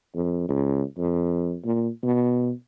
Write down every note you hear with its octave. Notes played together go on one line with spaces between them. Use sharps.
F2
C#2
F2
A#2
B2